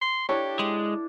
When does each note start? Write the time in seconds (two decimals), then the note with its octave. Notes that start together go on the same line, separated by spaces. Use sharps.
0.01 C6
0.29 D4 E4 G4 A4 C#5
0.59 G#3